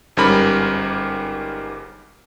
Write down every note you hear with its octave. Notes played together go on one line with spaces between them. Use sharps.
G1 G#2 G3 C#4 A#4 B5